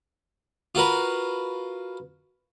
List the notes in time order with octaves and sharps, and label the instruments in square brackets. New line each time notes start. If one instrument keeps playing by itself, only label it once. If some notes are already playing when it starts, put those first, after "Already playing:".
[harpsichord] F4 F#4 A#4 B4